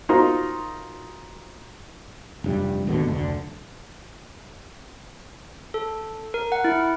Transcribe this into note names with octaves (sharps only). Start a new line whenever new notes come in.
D#4 F4 F#4 A#4 C5 C6
F1 G2 G3
G#1 D#2 B2 D3
F1 D2 D3
A4
A#4
F#5
E4